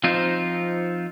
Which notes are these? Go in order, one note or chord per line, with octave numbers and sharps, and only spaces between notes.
F3 C4 D#4 F4